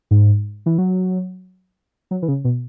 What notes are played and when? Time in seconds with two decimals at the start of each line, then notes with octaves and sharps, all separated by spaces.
0.11 G#2
0.66 E3
0.78 F#3
2.11 F#3
2.22 E3
2.28 C#3
2.44 B2